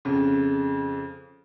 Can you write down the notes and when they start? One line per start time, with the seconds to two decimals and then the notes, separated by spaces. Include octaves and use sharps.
0.05 F2 C#3